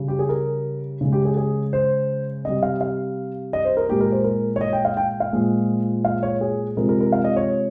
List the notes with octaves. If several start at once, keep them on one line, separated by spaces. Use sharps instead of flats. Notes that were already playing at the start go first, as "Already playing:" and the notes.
Already playing: C#3 G3
G4
G#4
A#4
C#3 G#3
G4
G#4
G#4
C5
C3 G3 D#5
F5
F5
D#5
C5
A#4
A#2 G#3 G4
A#4
C5
A#4
C#5
D#5
G5
F5
G5
F5
A#2 F3 G#3
F5
C#5
G#4
C3 F3 G#3 A#4
A#4
A#4
F5
D#5
C#5